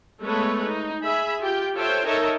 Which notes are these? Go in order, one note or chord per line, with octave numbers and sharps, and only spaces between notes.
G#3 A3 B3 A4 B4 C#5
D#4
G#4 E5 B5
F4 G4 G5
F4 A4 C5 C#5 E5 G5
D#4 A4 A#4 C#5 D#5 E5